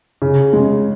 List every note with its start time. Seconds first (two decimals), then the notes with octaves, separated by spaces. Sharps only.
0.22 C#3
0.53 G#3